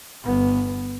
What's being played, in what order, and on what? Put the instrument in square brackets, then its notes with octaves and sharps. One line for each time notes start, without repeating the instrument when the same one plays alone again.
[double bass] G1 B3